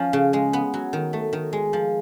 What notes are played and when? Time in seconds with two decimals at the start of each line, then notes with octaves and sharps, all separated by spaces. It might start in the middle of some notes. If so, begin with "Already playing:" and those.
Already playing: F3 C#4
0.13 C#3
0.33 G#3
0.53 B3
0.74 F#3
0.93 D#3
1.13 A3
1.33 D#3
1.53 G#3
1.73 F3